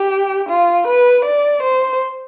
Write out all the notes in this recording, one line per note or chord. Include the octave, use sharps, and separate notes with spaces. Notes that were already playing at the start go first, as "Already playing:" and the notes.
Already playing: G4
F4
B4
D5
C5